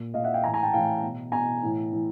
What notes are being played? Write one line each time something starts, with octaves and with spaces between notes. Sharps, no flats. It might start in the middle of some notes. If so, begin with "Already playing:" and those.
Already playing: A#2
A#2 D#5 F5
E5 F#5
F5 G5
A2 E3 G#5 A#5
G#5 A#5
G5 A5
A2 E3 F5 G5
B2
B2 G#5 A#5
A2 E3
E3